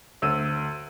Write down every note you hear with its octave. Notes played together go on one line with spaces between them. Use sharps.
D2 E6 D#7